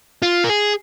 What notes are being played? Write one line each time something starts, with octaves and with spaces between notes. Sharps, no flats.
F4
A#4
G#4